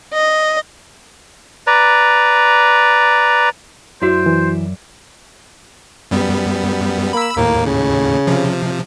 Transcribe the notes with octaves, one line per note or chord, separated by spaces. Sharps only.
D#5
B4 D5 A#5
F#2 E4 F#4 C5 D5 E5
E3
F#2 G3 B3
A#3 B5 E6
D#2 A2 A#3
C#3
C3 F3